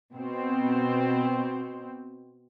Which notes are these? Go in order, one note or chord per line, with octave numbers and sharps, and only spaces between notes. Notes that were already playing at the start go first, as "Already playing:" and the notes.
B2 C4